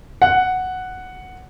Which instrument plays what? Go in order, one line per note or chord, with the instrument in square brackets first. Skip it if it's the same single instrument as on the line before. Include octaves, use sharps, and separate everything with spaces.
[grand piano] F#5